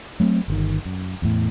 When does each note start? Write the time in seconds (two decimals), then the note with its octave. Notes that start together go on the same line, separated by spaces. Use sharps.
0.20 F#3 A3 A#3 C4
0.48 G1 C3 D#3
0.85 F#2
1.22 E2 A2